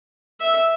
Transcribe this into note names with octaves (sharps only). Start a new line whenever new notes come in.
E5